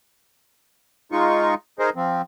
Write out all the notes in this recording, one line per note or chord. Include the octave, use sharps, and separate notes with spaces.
G#3 D#4 F4 C#6
D#4 G#4 A#4 C5
F3 C4